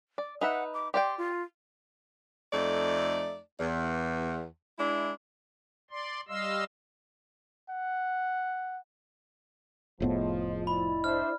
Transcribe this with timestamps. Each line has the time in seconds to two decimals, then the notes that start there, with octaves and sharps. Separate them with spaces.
0.18 D5
0.41 D#4 B4 E5 F#5
0.74 D6
0.94 G4 D5 G5 C6
1.18 F4
2.52 F2 A3 D#4 D5
3.59 E2
4.77 G#3 D4 E4
5.91 D5 C6
6.29 G3 D#5 F5 C6 E6
7.69 F#5
10.00 F1 A2 F3 B3 F4 G#4 D#5
10.67 E4 D5 D#5 B5
11.04 D4 C5 E5 F6